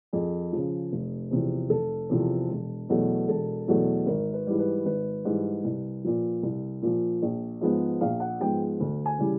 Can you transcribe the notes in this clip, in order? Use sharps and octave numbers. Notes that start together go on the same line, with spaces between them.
F2 G#4
C#3 F3
F1
E2 C3 F3
F1 A4
E2 C3 F3
E1
E2 B2 F#3 A3
E1 A4
E2 B2 F#3 A3
G#1 A#4
B4
G#2 E3 G3
B4
G#1 B4
G#2 E3 G3
C2
A#2 F3
C2
A#2 F3
A#1
G#2 F3 G#3 B3
A#1 F5
F#5
G#2 F3 G#3 B3 G5
D2
G#5
C#3 E3 G3